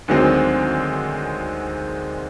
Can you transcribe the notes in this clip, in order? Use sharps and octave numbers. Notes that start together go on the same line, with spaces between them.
D2 D#3 F#3 G#3 C4 D4